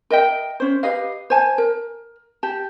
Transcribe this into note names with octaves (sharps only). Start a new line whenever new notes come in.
A#4 D#5 E5 G5
C#4 C5
G4 B4 D#5 F5
C5 G#5 A5
A#4
G4 A5